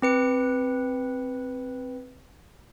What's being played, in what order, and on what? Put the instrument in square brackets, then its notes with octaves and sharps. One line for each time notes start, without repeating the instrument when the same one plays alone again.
[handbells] C4 B4 C#7